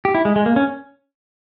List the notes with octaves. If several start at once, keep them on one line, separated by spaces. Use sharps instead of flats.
G4
E4
G#3
G#3
A#3
C#4